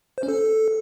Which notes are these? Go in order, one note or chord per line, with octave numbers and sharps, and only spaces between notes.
C5
C#4
A4